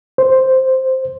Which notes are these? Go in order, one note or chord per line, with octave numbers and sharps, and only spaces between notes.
C5